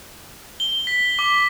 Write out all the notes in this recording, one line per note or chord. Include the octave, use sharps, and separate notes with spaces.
G7
B6
D6